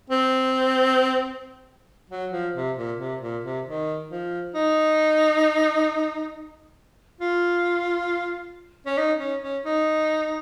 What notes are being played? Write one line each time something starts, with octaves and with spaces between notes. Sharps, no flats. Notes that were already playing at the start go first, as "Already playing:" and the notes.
C4
F#3
F3
C3
A#2
C3
A#2
C3
D#3
F3
D#4
F4
C#4
D#4
C#4
C#4
D#4